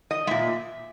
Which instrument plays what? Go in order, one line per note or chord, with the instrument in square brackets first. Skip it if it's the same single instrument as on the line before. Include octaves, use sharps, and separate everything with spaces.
[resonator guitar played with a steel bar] D#5
A#2 G#3 E5